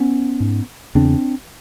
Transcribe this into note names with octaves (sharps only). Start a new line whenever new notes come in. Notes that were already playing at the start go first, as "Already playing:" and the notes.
Already playing: B3 C#4
G#2
E2 C#3 C4 D4